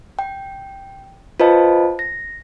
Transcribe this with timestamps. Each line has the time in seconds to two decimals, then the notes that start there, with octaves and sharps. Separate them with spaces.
0.19 G5
1.40 F4 B4 C5 D#5 A5
1.99 A#6